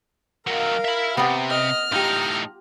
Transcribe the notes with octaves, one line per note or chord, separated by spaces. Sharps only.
D#3 F#3 A#4 F5
E5 B5
C3 B3 G4 D5
D#5 F6
A2 D#4 F4 G4 A#5